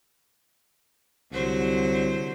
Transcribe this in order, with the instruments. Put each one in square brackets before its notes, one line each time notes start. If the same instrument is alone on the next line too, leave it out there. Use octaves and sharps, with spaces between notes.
[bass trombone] C2 [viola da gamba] D3 F#3 C5